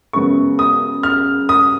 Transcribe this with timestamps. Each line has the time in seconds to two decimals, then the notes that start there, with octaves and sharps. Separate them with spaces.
0.13 F#2 C#3 G#3 B3 C#6
0.59 D#6
1.03 F6
1.49 D#6